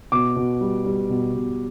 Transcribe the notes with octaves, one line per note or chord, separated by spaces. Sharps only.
B2 D6
B2
G3
G3
B2
B2